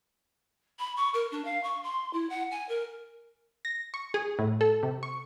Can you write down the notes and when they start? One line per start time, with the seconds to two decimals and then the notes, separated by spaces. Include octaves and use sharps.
0.79 B5
0.97 C#6
1.14 A#4
1.32 D4
1.45 F5
1.63 C#6
1.84 C6
2.13 E4
2.30 F#5
2.51 G#5
2.69 A#4
3.65 A#6
3.94 C#6
4.14 G#4
4.39 A2
4.61 A4
4.83 C3
5.03 C#6